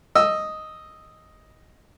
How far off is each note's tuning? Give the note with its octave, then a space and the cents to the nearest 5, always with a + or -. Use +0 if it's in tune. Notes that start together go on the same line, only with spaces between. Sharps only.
D#5 +0 E6 +0